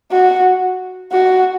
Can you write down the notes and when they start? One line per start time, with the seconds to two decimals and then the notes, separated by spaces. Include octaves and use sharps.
0.12 F#4
1.12 F#4